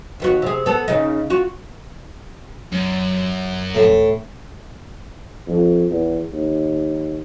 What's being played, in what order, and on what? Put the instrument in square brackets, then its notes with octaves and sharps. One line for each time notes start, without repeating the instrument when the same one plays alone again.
[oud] D#2 B3 F#4
C3 G#4
B3 A4
C#3 D#4
F4 F#4
[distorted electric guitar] F#2
[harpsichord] A2
[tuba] F2
E2
D#2